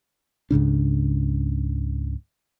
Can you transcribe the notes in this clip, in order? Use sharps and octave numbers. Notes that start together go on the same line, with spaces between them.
C#2 G#2 C#3 D4